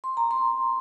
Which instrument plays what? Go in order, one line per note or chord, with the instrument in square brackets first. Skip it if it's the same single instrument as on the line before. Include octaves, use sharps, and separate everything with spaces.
[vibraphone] C6
A#5
C6